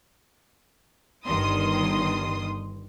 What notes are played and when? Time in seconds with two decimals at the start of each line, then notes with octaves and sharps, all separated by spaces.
1.26 G1 G2 D#3 C6 D#6